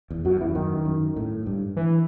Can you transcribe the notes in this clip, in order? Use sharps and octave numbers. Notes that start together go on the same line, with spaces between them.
E2
F#2 F#3
E2 E3
F#2 D#3
F#2
A2
G2
E3